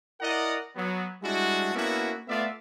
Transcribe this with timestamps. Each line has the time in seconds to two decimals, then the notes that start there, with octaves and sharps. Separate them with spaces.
0.21 E4 A#4 D5 D#5 F#5 A#5
0.75 F#3 B3
1.23 G3 G#3 D4 E4 F#4
1.74 A#3 B3 C#4 D4 E4 F#4
2.28 A3 B3 F4 D5 E5